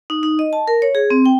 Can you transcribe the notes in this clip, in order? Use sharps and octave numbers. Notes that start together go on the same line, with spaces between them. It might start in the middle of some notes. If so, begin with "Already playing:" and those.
D#4
D#4
D#5
A5
A#4
C#5
G#4
C4
G5